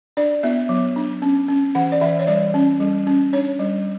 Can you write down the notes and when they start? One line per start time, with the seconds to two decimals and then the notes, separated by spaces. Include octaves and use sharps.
0.17 D4 D5
0.43 B3 E5
0.69 F#3
0.96 D4
1.22 C#4
1.48 C#4
1.75 E3 F#5
1.92 D5
2.01 E3 E5
2.19 C#5
2.27 G3 D5
2.54 C#4
2.80 G3
3.07 C#4
3.33 D4 C#5
3.59 G3